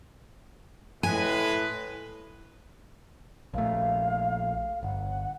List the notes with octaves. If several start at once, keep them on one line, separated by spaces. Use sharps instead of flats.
A2 G#3 B4 G#5
A#1 A3 F5
G1 F#5